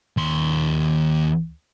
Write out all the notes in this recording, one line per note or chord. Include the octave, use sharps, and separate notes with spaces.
D#2 C6